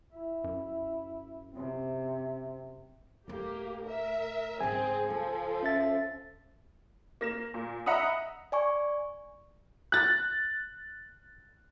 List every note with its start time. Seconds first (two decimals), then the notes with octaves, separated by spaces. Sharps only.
0.13 E4
0.44 F#2
1.54 C3 C4
3.28 D1 A3 A#3 G4
3.84 A#4 E5
4.61 G#2 C#3 C4 G#4 G#5
5.10 C#2 F3 A4
5.63 C#4 E5 A6
7.21 A#3 A#6 E7
7.54 A#2
7.86 D#5 E5 F#5 A#5 B5 D#6
8.52 D5 G#5 C#6
9.92 F#6 A6